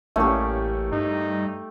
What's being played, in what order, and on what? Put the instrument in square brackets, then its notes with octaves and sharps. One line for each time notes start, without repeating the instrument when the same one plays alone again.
[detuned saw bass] A1 [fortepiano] A2 A#3 C#4 [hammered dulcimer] A3 G4
[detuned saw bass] G2 [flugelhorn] D#4